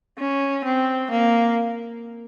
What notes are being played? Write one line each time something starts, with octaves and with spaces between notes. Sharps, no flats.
C#4
C4
A#3